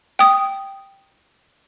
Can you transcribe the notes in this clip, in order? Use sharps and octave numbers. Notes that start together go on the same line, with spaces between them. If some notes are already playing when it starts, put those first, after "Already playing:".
G5 D#6